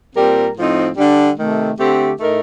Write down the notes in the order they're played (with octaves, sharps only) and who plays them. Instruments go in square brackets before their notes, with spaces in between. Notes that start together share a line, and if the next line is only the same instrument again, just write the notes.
[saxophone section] A#2 G3 C4 G4 A#4
A2 F3 C4 D#4
D3 G3 D4
C3 D#3 A3
D3 A3 C4 G4
A2 A3 D#4 A#4